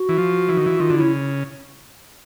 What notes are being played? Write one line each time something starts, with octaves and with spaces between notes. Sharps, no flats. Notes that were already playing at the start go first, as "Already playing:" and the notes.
Already playing: F#4
E3
F3
E3
D#3
E3
D#3 F4
D3
E4
C#3